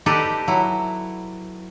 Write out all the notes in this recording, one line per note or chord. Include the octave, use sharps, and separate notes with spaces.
D#4 G4 A4 B4 D5 D#5
F#3 E4